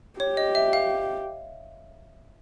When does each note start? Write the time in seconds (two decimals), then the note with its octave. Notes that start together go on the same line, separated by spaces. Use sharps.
0.20 G4 C#5
0.37 D#5
0.55 E5
0.73 F5